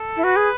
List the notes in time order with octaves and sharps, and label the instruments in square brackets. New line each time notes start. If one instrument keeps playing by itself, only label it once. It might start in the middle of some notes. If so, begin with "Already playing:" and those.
Already playing: [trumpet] A4
[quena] E4
[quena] F#4 [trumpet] B4
[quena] G#4